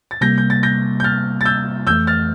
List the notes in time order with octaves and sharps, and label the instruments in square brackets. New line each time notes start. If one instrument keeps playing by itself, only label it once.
[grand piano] A6
[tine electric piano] C3 G3 A#3 [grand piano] G6 A#6
[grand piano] G6
A6
G6 A#6
G6
F6 A6
A6
E6 G6
[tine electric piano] F2 E3 A3 [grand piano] E6 G6
[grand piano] F6 A6